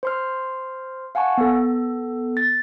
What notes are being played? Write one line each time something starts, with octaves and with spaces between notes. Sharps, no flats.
C5 C6 F6
F5 F#5 G#5 A5 C#6
B3 A4
A6